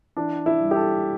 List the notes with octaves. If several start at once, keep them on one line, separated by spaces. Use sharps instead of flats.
E3 D4
E4
G3
G4
A4